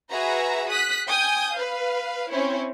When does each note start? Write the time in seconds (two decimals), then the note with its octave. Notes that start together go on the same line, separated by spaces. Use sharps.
0.10 F#4 G#4 B4 E5 A#5
0.69 D#6 F#6 B6
1.09 G5 G#5 D#6 G6
1.53 B4 F5
2.29 C4 C#4 E4 C#5